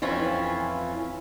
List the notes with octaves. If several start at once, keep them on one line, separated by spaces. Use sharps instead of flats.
F2 E3 C#4 E4 F4